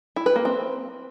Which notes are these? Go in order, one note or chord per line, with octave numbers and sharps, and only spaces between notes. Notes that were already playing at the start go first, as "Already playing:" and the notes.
E4
B4
A#3
C4